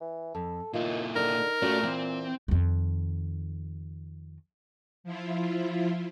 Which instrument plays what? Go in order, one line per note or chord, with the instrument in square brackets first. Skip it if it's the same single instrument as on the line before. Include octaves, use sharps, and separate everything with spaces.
[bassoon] E3
[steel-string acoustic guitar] F2 [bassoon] A4
[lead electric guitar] A#2 E4 [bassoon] D#3 [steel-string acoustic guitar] F4
[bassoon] D3 [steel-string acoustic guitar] D#4 [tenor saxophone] A#4
[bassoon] A#2 [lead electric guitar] A3 [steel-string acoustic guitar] C#4 F#4 D5
[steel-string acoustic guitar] E3 [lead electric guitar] C4
[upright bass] F2 D#3
[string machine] F3 E4 F4